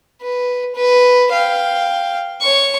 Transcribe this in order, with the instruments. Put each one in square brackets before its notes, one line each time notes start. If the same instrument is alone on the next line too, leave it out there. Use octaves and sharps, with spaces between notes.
[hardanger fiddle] B4
B4
F5 G5
C#5 C#6